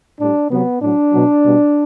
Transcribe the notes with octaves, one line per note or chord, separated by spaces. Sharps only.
A2 G3 D4
C3 F#3 B3
A2 F#3 D4
B2 F#3
B2 G3